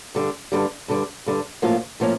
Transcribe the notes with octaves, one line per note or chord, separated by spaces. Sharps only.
G2 D3 G3
G2 D3 G3
G2 D3 G3
G2 D3 G3
A2 F3 A#3 C#4 F4
A2 F3 A#3 C#4